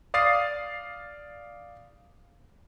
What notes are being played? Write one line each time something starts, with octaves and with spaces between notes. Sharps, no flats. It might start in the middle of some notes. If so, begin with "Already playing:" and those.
D5 F5 D#6 A6 C7